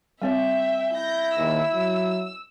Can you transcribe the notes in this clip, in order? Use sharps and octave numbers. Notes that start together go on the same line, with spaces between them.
G3 C4 C#5 E5 G5
E4 G6 A#6
D#2 E6
F#3